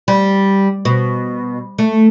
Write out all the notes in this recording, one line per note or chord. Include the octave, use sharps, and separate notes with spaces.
G3
B2
A3